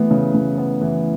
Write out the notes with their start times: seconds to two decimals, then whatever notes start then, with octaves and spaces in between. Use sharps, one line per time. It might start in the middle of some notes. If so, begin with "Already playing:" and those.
Already playing: E3 A3 B3
0.11 C#3
0.34 C#3
0.58 B3
0.81 E3